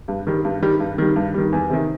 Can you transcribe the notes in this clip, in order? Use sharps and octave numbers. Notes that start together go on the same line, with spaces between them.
G2
D#3 G3
G2
D#3 G3
G2
D#3 G3
G2
D#3 G3
E2
C3 D#3